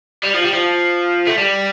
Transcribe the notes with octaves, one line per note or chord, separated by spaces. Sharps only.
G3
F3
G3
F3
A3
G3